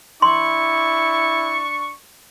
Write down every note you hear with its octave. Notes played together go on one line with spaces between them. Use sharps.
D4 E4 C6 C#6